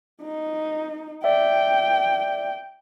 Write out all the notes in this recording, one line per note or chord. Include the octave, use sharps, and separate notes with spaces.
D#4
D5 E5 G5